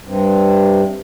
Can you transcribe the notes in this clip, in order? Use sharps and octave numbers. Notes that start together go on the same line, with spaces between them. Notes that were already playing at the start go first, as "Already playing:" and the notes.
G2 C3